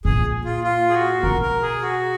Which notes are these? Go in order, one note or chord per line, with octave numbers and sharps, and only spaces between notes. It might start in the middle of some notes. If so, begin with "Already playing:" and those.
A#2 G#4
F4
F4
G#4
F#4
B2 A#4
A#4
G#4
F#4